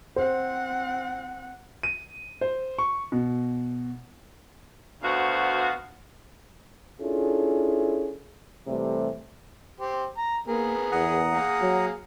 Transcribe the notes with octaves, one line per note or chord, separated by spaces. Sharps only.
C4 C5 F#5
D#7
C5
C#6
B2
D2 B3 F#4 C5 F5
C#4 D4 E4 F4 G#4 A4
C3 E3 G3 A3
G4 C5
A#5
A#3 B3 G#4 A#4
E2 F#5 A#5 D#6
A#3 G#4
F#3